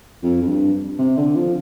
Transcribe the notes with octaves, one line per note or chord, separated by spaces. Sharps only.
F2
F2
G2
C3
D3
F3